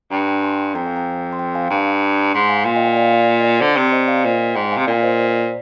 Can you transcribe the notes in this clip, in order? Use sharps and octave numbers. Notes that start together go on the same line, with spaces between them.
G2 G5 A#5
G5 A#5
G#5 C6
F2 G5 A#5
F5 G#5
G5 A#5
C6
G5 A#5
F5 G#5
G2
G#2 G#5 C6
F5 G#5
A#2 F5 G#5
D#5 G5
D5 F5
D5 F5
D5
D5
D#5
D5
D3 C5
C3 D5
C5 D#5
D5 F5
A#2 C5 D#5
G#2 D#5 G5
F5 G#5
C3
A#2 D5
C5 D#5
C5
D5
D5